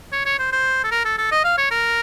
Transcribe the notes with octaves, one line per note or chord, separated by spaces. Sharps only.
C#5
C#5
C5
C5
A4
A#4
A4
A4
D#5
F5
C#5
A#4